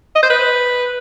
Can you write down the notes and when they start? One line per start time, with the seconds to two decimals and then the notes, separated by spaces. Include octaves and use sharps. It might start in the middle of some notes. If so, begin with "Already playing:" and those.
0.15 D#5
0.23 C5
0.30 B4